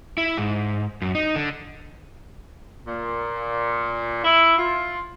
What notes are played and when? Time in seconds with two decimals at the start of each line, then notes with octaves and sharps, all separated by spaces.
0.18 E4
0.38 G#2
1.02 F#2
1.15 D#4
1.36 D3
2.85 A#2
4.24 E4
4.57 F4